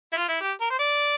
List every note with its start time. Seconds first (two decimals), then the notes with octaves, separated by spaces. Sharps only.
0.12 E4
0.16 F4
0.28 E4
0.41 G4
0.61 A#4
0.70 C5
0.79 D5